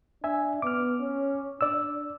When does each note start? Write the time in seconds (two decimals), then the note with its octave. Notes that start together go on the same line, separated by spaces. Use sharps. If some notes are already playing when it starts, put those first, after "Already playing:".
0.24 D4 E5 G#5
0.62 B3 D6 F6
1.00 C#4
1.61 D4 D5 E6